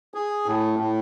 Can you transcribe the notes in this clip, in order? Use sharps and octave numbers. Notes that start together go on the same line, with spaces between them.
G#4
A2
A2